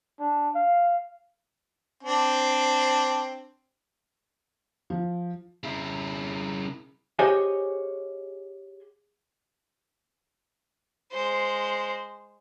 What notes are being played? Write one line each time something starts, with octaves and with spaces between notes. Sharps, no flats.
D4
F5
C4 D4
F3
C#3 E4
G4 G#4 C5 C#5 D#5 G#5
G#3 C5